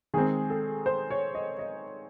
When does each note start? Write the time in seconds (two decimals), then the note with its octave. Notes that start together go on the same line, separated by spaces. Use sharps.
0.14 D#3 G#3 C4 G#4
0.50 A4
0.86 C5
1.10 C#5
1.35 D#5
1.59 D#5